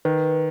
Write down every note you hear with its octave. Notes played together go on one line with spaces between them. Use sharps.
D#3 B4